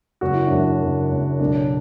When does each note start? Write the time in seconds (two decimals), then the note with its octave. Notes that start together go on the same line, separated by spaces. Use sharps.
0.21 F#1 F#4
0.34 E4
0.47 F#2 D4
0.60 E4
0.81 F#1
1.11 F#1
1.40 B1 D4